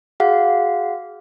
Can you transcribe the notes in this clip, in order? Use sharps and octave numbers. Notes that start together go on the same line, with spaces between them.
F#4 G#4 F5 F#5